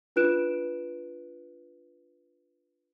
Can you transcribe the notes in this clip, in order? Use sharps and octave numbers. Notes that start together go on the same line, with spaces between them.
D4 F4 B4 F#6 D7 E7